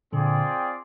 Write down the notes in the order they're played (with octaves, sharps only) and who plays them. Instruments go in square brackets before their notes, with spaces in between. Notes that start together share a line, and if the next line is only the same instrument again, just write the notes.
[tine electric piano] A#2 D3 [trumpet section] C4 F4 G#4 D5 G5